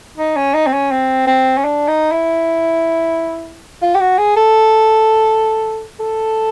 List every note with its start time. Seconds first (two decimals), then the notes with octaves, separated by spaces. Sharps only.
0.18 D#4
0.36 C#4
0.54 D#4
0.67 C4
0.73 C#4
0.91 C4
1.27 C4
1.57 C#4
1.64 D4
1.88 D#4
2.11 E4
3.82 F4
3.95 G4
4.00 F#4
4.18 G#4
4.36 A4
6.00 A4